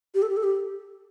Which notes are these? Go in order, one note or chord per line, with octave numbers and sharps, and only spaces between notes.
G4
A4
G4
A4
G4